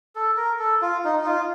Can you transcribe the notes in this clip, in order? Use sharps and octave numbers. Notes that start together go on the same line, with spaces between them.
A4
A#4
A4
F4
D#4
D#4
F4